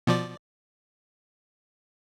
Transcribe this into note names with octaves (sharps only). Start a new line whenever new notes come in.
B2 F3 D5